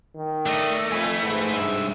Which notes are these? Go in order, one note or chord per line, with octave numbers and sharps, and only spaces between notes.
D#3
A3 D4 D#5
F2 B4 G#5
G#2
G2 E5